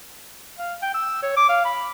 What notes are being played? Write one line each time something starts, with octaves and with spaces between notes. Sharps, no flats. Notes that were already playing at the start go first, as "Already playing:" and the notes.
F5
G5
E6
C#5
D6
F5
B5